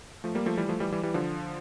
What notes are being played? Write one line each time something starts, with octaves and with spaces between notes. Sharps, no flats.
F3 A3
G3 A#3
F3 A3
E3 G3
F3 A3
E3 G3
E3 G3
E3 G3
D3 F3